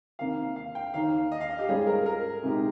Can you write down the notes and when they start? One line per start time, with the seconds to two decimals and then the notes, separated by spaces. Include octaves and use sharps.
0.19 C3 D#3 A#3 F5
0.56 F5
0.75 G5
0.94 D#2 D#3 A#3 D#4 F5
1.32 D#5
1.41 F5
1.50 D#5
1.59 G4
1.69 G#2 G3 C#4 F4 G#4 C5
1.87 A#4
2.06 A#4
2.43 C2 A#2 G#3 D#4 G4